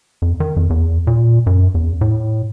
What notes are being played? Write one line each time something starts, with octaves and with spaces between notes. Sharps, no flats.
F2
D#3
F2
E2
A#2
F#2
E2
A2